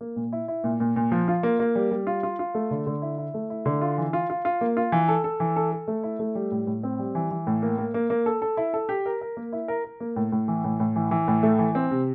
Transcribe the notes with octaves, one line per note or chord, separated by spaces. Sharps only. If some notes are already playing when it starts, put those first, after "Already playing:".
A#3
A#2
E4
E4
A#2
A#2
A#2
F3
F4
A#3
A#3
G3
G3
F4
F4
F4
A3
D3
D3
E4
E4
A3
E4
D3
F4
E3
F4
F4
F4
A#3
F4
E3
A4
A4
E3
A4
A4
A3
E4
A3
G3
A2
A2
C4
G3
E3
E3
A2
A#3
A#3
A#3
A#3
A4
A4
E4
A4
G4
A#4
A#4
A#3
E4
A#4
A#4
A#3
A2
A2
E3
A2
A2
E3
E3
A2
A3
E3
C4
C3